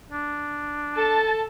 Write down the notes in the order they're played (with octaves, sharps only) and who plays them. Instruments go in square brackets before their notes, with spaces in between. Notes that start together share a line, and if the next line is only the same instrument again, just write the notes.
[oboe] D4
[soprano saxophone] A4 [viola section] A5